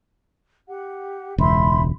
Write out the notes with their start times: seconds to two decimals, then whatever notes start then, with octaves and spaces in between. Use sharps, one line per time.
0.68 G4 F#5
1.38 E1 C#2 E5 B5 C6